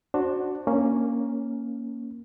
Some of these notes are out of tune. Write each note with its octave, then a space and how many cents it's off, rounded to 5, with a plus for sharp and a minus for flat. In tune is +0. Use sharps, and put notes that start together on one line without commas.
D4 +10 F#4 +0 C5 +20
A#3 +0 C#4 +0